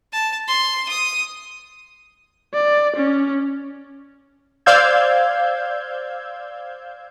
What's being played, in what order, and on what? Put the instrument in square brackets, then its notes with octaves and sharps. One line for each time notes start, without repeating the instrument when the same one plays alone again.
[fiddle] A5
C6
D#6
[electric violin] D5
C#4
[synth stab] C5 D5 F5 E6 G6 G#6